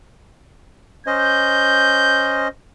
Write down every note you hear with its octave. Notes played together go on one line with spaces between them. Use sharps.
C#4 C5 D#5 G6